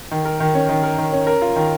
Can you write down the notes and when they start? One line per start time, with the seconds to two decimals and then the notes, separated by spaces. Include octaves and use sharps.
0.11 D#3
0.25 A#4
0.40 D#3
0.55 C#4
0.69 D#3
0.83 A#4
0.98 D#3
1.13 C#4
1.27 A#4
1.42 F4
1.56 D#3